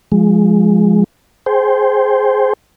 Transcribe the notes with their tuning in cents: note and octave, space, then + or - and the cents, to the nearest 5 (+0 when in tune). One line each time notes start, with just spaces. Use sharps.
F3 +0 G#3 +0
G#4 +10 C5 +0 G5 +0